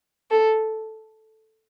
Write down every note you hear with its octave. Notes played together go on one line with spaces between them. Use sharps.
A4